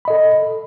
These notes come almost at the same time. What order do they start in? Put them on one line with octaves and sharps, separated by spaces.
B5 D#5 A4